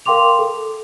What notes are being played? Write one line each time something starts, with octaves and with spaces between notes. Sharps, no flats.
A#4 F5 G5 C6 D6 F7
A4